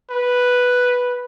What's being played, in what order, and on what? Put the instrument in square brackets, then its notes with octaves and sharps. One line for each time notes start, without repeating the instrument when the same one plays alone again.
[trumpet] B4